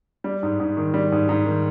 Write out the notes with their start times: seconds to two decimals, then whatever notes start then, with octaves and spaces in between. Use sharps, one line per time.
0.24 G3
0.43 G#2
0.60 G#2
0.77 D#3
0.94 G3
1.12 G#2
1.29 G#2
1.46 D#3